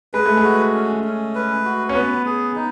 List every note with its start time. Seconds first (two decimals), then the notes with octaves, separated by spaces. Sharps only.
0.13 G#3 B4
0.26 A3
0.37 G#3
0.44 F#4
0.74 C#4
1.04 C#4
1.35 B4
1.65 F#4
1.89 C#4
1.95 B3 B4
2.25 G#4
2.55 D#4